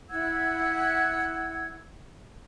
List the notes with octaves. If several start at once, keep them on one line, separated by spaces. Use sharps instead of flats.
E4 F#5 E6 G#6